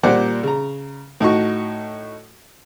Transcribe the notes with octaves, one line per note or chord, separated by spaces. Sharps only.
A#2 G3 A#3 C5 D5 F#5
C#3 A#5
A2 D#4 F#4 C#6